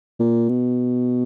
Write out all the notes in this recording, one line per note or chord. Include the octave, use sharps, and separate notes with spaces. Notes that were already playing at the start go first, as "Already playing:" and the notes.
A#2
B2